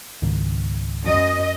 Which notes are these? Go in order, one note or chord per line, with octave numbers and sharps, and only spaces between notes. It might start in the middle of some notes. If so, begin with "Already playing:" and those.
C#2 G#2 D#3
F#2 D#5